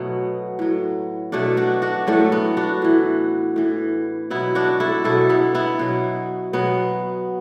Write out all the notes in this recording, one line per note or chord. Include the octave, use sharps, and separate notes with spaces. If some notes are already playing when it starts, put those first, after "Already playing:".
Already playing: B2 F#3 A3 B3
A2 F#3
B2 F#3 A3 D4
D4 F#4
D4 F#4
A2 F#3 A3 D4
B3
D4 F#4
A2 E3
A2 E3
B2 F#3 B3 E4
D4 F#4
E4 A4
B2 F#3 E4 A4
B3 E4
B3 E4
B2 F#3
B2 F#3 B3